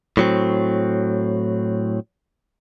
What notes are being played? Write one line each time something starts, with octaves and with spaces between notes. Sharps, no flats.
A2 F#3 C4